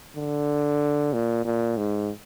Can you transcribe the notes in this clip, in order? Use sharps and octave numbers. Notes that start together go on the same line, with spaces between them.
D3
A#2
A#2
G#2